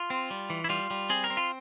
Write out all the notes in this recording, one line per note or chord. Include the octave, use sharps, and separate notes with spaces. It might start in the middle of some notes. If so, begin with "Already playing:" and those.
Already playing: F4
C4
G3
E3
E4
G3 F4
G3
C4 G#4
A#4
C4
F4